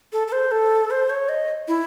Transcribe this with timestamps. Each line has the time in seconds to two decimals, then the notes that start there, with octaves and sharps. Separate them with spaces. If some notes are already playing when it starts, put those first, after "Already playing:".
0.13 A4
0.27 A4
0.32 C5
0.51 A4
0.91 C5
1.10 C#5
1.29 D#5
1.68 E4